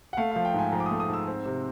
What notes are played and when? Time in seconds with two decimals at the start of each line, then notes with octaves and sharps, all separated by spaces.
0.13 F#5
0.17 A3 F5
0.31 F3 F5
0.45 G5
0.54 G#2 G#5
0.72 F3 A#5
0.80 D6
0.86 D#6
0.91 A3
1.00 D#6
1.09 G#2 E6
1.27 C4
1.46 C3